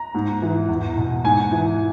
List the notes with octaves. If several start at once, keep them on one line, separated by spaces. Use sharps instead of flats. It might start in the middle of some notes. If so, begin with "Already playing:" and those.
Already playing: A#5
G#2
E3
E2
B2
G#2 G#5
E3